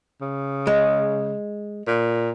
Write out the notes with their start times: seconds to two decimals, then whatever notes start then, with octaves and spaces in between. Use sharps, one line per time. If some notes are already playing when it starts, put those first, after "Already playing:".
0.21 C#3
0.67 G#3
1.88 A#2